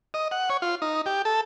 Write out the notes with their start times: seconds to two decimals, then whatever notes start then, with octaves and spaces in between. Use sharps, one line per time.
0.14 D#5
0.31 F#5
0.50 C#5
0.62 F4
0.82 D#4
1.06 G4
1.25 A4